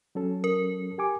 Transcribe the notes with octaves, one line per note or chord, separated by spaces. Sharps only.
F#3 C#4 A4
A#4
G4 G#5 D6